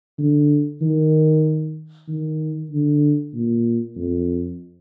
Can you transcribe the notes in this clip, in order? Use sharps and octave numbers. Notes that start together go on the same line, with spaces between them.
D3
D#3
D#3
D3
A#2
F2